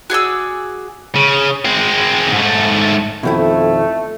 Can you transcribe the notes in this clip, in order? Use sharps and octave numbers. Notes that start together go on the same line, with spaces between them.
F#4 G#4 D5 E6
C#3
G#3 C4
G#2 A3
F2 B2 D#3 A3 E4